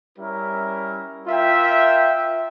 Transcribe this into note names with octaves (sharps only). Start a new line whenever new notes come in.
G3 C#4 E4 A#4 E5
F4 A#4 E5 G5